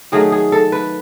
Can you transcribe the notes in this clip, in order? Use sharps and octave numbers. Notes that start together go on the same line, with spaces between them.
D#3 F#3 A3 G#4
G#4
A4
B4